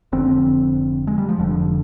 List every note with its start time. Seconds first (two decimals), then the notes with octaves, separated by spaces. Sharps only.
0.12 F1 F2 D3 C4
1.07 G#3
1.18 G3
1.29 F3
1.38 F1 F2 D3